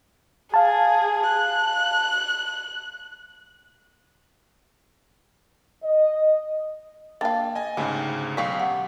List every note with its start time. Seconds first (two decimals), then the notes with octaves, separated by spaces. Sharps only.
0.54 G#4 F5 A5
1.28 F#6
5.83 D#5
7.21 A#3 D4 F5 G5 A5 A6
7.55 D#5 G#5
7.77 D2 G#2 C#3 G3 C4
8.37 B1 G3 C4 F5 C#6 B6
8.60 G4 F#5